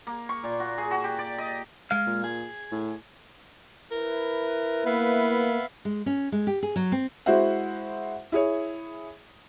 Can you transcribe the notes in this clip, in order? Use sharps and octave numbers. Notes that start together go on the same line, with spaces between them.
A#3
C#6
A#2
F#4
G#4
F#4
G4
D5
D#5
G#3 F5
A#2
G#4
A2
E4 A#4 B4
A#3 B3 E5 F5
G#3
C#4
G#3
G4
G#4
F#3
C4
G#3 E4 F#4 C5 E5 F#5
E4 G#4 C#5